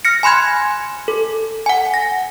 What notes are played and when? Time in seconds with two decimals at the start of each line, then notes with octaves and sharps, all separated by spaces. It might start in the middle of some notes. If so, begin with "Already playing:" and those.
0.05 F6 A#6 C#7
0.23 G#5 B5 C6 F#6 G#6
1.08 A4
1.66 F#5 G#5
1.94 A#6